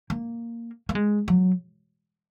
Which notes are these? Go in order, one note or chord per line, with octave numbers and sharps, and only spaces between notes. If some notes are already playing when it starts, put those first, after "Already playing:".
A#3
A#3
G#3
F#3